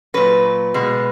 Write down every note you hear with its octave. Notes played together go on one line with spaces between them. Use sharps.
A#2 F#3 B4
B2 G#3